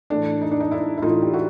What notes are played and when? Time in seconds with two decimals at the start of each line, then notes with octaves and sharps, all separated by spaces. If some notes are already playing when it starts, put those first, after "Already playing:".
0.10 A2 E3 A3 D4
0.41 D#4
0.51 D4
0.60 D#4
0.71 D4 E4
0.97 E4
1.02 A2 E3 A3 D#4 F4
1.22 G4
1.34 E4 F#4